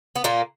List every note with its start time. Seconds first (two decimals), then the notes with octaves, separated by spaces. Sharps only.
0.16 B3
0.24 A#2 A#3